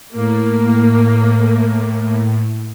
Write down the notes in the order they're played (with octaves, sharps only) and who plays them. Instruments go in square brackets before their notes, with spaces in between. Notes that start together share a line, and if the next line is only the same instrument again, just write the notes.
[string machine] A2 [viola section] A#3